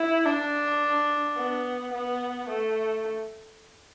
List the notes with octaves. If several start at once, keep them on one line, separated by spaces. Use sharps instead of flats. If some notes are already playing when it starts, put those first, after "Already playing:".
Already playing: E4
D4
B3
B3
A3